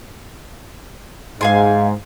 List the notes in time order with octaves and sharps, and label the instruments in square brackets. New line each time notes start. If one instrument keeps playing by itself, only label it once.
[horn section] G#2 [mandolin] F5 G#5 C6